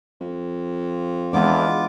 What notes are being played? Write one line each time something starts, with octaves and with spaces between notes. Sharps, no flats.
F2
E2 E3 G#3 B3 D4 F4 D6